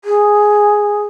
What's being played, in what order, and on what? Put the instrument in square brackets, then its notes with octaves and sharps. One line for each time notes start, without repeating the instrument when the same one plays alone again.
[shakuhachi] G#4